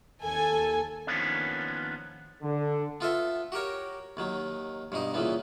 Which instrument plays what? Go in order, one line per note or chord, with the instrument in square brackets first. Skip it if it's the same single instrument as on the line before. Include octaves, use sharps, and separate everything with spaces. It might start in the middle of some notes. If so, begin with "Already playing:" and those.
[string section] D#2 A4 G#5
[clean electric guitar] D#3 F3 A#3 B3 C#4 D4
[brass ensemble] D3
[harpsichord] B3 F4 A4 E5
F#4 G4 A#4 C#5
D#2 D#3 F#3
G2 B2 D#4
A#2 C#3 E3 B3